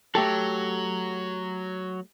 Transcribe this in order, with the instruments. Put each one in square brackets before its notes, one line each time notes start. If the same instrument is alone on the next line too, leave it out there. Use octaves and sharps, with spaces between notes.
[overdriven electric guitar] F#3 [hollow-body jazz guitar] A3 G4 A4